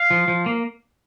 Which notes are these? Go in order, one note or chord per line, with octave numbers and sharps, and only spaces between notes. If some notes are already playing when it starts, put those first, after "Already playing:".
Already playing: F5
F3
F3
A#3